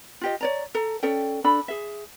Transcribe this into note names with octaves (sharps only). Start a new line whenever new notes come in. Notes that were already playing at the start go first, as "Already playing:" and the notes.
F4 G4 D#5
C#5 D5 A#5
A4 A#5
C#4 A4 D5 G5
D4 A4 B5
G#4 E5